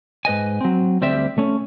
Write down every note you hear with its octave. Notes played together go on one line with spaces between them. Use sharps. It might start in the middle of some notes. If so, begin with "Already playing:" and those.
G#2 B4 D#5 G#5
F#3 C4
D2 G3 C4 G4 E5
A3 C#4